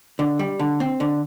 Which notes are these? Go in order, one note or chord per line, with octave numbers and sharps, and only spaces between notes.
D3
G3
D3
C4
D3